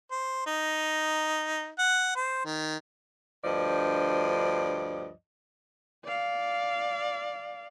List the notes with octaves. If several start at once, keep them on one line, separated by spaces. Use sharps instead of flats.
C5
D#4
F#5
C5
D#3
D2 G2 F3 D5 D#5
D5 F5